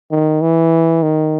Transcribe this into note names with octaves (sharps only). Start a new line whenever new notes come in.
D#3
E3
D#3